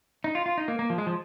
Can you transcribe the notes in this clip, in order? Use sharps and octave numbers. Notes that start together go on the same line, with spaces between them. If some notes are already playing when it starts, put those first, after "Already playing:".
D#4
F4
F4
D#4
A#3
A#3
F3
G#3
F3